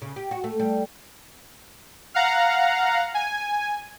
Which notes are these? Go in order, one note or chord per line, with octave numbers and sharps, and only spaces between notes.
C#3
G4
F#4
A3
G3
F5 F#5 A#5
G#5